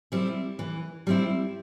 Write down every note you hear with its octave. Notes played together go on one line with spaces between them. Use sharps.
G3 C4 E4
E3
G3 C4 E4